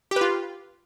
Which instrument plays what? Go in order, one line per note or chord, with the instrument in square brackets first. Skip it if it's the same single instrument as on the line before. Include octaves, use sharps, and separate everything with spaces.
[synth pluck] G4
B4
F4